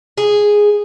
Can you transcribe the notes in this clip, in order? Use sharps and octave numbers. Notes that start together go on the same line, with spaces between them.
G#4